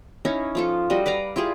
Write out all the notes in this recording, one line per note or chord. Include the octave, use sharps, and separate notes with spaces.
C#4 D#4 E4
F3 F4 A4
G3 F#4 D#5
B4 D5 F5 A#5
E4 F4 G4 G#4